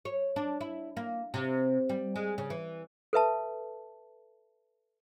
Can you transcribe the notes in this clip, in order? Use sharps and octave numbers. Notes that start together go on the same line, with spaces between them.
C#5
D4
E4
A#3
C3
G3
G#3
C#3
E3
A4 B4 E5 A5